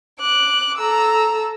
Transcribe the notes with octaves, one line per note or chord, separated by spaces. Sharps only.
D6 F#6
A4 A#5 E6